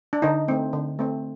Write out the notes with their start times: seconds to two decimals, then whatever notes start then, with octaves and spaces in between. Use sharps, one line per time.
0.13 D4
0.22 D3 D#4
0.48 A3 C4
0.73 D3
0.99 A3 C4